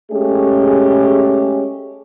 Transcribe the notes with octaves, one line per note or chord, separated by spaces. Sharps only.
G#3 A3 C#4 G4 G#4